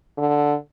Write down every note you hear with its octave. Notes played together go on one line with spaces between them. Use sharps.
D3